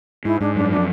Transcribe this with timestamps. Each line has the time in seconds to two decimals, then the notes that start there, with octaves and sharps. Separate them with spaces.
0.25 G#2 E4
0.40 G#2 D4
0.55 F#2 D4
0.71 F3 D4